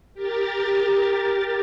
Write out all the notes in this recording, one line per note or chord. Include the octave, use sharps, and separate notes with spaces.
G4 A#4 A6